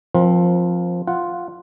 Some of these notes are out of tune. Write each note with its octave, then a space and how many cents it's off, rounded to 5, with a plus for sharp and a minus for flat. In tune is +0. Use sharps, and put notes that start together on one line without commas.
F3 +5 C4 +15 A#4 +35
F4 +0 F#5 +0